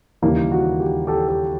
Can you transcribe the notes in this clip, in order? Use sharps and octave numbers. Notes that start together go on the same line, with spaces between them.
D#2 C#3 E3 G3 A#3 G4
F#4
G4
G4 A4
G4 A4